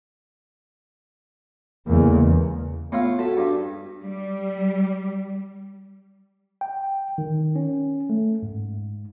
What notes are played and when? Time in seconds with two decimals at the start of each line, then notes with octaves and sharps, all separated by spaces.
1.87 A1 E2 C#3 G#3 A#3
2.92 A2 B3 F4
3.19 F#4 A4 A5 B6
3.37 G2
4.02 G3
6.61 G5
7.18 D#3
7.56 C#4
8.10 A3
8.43 G#2